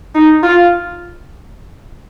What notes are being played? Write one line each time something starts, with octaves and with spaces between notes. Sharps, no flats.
D#4
F4